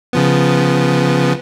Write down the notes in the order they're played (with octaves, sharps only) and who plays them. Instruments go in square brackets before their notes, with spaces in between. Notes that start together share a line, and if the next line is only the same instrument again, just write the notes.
[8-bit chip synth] C#3 F3 B3